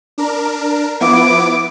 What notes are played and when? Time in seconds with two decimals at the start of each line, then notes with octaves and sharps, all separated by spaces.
0.18 D4 A#4
1.00 F3 B3 E4 D6